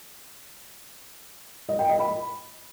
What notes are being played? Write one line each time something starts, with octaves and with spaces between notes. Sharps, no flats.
D#5
G5
D#5
B5